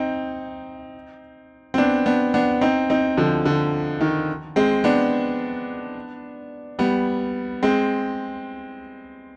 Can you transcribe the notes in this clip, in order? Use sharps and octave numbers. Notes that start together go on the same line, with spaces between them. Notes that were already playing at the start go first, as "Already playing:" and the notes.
Already playing: C4 D#4
C4
B3 D4
B3 D4
B3 D4
C4 D#4
C4 D#4
D3 F3
D3
D#3
G#3 C4
B3 D4
G3 B3
G#3 C4